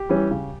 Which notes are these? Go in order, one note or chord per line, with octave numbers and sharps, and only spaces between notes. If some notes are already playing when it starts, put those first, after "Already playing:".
Already playing: G4
E3 G3 C#4
C#3